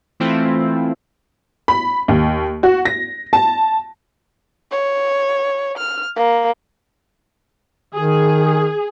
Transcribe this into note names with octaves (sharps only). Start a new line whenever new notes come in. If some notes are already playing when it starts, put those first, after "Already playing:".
E3 A3 C4 E4 F4
B5
D#2
F#4
A#6
A5
C#5
F6
A#3
D#3 G#4